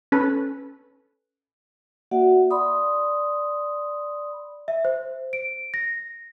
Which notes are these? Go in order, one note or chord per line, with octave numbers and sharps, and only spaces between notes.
C#4 A4 B4
A#3 F#4 D5 E5 F#5
D5 B5 C6 D#6
E5
C5
D7
A#6